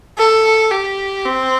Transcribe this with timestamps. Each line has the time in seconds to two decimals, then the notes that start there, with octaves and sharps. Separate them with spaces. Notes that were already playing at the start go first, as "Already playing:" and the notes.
0.18 A4
0.71 G4
1.25 C4